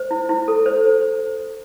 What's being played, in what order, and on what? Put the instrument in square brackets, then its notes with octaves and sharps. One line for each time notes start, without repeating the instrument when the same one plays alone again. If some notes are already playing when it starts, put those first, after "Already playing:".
Already playing: [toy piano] C5
E4
E4
A4
C5